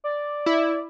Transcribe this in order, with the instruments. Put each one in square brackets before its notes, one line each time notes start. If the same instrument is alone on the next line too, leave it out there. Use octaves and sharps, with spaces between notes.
[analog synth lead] D5
[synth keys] E4